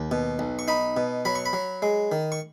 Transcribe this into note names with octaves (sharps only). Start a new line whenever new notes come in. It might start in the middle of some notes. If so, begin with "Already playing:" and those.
Already playing: D#2
B2
B1
C#6
D#4 B5
B2
F#3 B5
C#6
B5
F#3
G#3
D#3
C#6